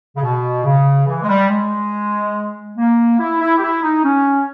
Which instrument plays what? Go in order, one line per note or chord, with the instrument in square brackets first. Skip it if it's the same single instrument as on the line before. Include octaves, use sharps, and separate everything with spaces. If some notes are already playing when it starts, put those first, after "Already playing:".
[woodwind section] C#3
B2
C#3
E3
G#3
G3
G#3
A#3
E4
E4
G4
E4
D#4
C#4